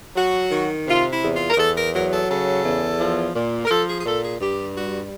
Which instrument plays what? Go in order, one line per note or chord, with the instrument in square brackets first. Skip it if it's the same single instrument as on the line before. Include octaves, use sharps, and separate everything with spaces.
[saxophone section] F#3 F#4
D#3
C3 F4
E4
E2
F4
A#4
E2 A4
A#4
F#3 A#4
A4
C#3 A4
E2
F3
A#2
A#4
F3 A4
G#4
G#4
A#2 A4
G#4
G2 G4
G3 F#4